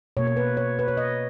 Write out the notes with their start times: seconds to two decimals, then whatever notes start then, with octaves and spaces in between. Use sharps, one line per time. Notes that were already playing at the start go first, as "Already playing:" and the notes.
0.17 B2 A#3 C#5
0.27 C#5
0.37 B4
0.57 C#5
0.79 B4
0.88 C#5
0.97 D#5